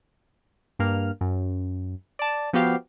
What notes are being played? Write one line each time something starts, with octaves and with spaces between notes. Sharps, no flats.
G2 A#3 F6
F#2
D5 A5
F3 B3 F#4 G4 F5